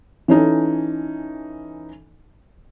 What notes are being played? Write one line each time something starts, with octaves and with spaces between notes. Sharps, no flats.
E3 C#4 D#4 A4